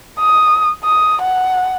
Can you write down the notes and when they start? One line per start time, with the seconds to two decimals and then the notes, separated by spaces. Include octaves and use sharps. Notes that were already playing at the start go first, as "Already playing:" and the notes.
0.20 D#6
0.84 D#6
1.22 F#5